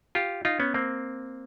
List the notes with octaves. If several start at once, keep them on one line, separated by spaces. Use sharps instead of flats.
F4 G4
D#4 F4
B3 C#4
A#3 C4